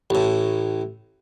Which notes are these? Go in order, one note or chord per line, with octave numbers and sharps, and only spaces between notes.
A1 A2